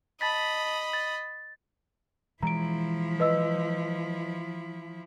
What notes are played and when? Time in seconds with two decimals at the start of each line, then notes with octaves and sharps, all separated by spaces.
0.21 D#5 A5 B5 A6 B6
0.93 A6
2.43 E3 F3 G#3 E4 A#5 D7
3.20 B4 D#5 E6